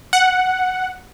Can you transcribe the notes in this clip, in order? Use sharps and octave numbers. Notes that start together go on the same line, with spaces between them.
F#5